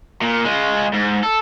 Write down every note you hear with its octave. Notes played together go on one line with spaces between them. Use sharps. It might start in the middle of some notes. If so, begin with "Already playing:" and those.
A#2
G#3 F4
G#2
A4